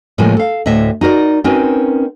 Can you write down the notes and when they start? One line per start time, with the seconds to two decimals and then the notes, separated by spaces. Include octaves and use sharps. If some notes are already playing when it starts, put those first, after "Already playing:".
0.18 A2 C#3 F3 G#3 A#3
0.37 A4 F5
0.66 D2 A2 D#5 E5
1.01 D#4 F#4 A#4 D5
1.44 C4 C#4 D#4 F#4 A#4 B4